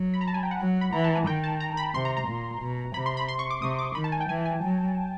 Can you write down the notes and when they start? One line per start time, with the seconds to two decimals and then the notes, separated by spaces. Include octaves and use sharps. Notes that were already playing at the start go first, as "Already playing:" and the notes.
Already playing: F#3
0.14 B5
0.21 A#5
0.27 A5
0.34 G#5
0.43 G5
0.51 F#5
0.60 F#3
0.81 B5
0.92 E3 A#5
1.04 A5
1.15 G#5
1.27 D#3 G5
1.44 A5
1.60 A#5
1.77 B5
1.94 C3 C6
2.05 A#5
2.17 A#5
2.27 A#2
2.61 B2
2.94 C3 B5
3.06 C6
3.17 B5
3.28 C6
3.39 C#6
3.50 D6
3.61 C3 D#6
3.79 D6
3.95 D#3 B5
4.04 A5
4.12 G#5
4.21 G5
4.29 E3 G#5
4.45 G#5
4.63 F#3